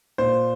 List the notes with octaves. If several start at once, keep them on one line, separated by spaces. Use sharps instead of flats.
A#2 C5